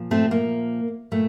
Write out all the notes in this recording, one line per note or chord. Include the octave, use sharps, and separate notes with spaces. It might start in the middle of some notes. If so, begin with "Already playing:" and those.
Already playing: A#2 F3
A3 C4
A#3
A#2 A3